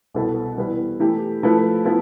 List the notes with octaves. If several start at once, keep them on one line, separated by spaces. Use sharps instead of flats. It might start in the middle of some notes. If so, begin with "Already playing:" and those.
C2 B2 B3 E4 A4
E3 G3 B3 E4 B4
E3 A3 E4 G4
F3 A3 E4 B4
F3 B3 E4